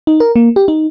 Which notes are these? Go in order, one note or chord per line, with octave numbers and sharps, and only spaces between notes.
D#4
A#4
A#3
G4
D#4